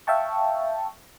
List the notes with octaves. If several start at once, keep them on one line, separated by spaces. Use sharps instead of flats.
E5 F5 G5 A5 C#6